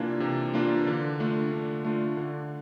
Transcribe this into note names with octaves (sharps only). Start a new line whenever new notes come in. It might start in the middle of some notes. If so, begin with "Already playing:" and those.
Already playing: C3 E3 A#3 D4 F4
C3
E3 A#3 D4 F4
D3
A3 D4 F4
D3
A3 D4 F4
D3